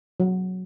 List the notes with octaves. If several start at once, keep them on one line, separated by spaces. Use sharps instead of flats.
F#3